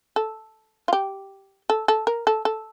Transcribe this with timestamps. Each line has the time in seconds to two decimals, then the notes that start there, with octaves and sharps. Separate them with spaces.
0.16 A4
0.88 F4
0.93 G4
1.70 A4
1.88 A4
2.07 A#4
2.27 A4
2.45 A4